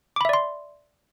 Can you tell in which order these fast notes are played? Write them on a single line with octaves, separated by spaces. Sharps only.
D6 B5 E5 D5 C6